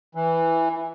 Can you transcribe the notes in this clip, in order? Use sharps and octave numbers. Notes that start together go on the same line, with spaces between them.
E3